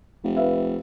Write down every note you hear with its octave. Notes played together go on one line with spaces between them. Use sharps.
F1
B4 E5 F5